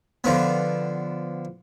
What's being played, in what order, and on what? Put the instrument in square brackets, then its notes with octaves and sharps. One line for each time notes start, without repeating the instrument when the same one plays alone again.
[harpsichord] D3 F3 B3